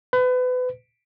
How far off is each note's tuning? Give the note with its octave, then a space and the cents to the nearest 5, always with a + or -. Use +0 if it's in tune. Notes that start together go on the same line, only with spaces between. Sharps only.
B4 +30